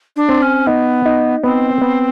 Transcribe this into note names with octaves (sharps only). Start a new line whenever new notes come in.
D4
C4
C#4
B3 D#4
D#4
B3 C4
B3